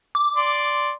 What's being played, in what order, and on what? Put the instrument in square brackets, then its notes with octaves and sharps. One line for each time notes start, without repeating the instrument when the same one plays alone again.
[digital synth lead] D6
[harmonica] D5 C6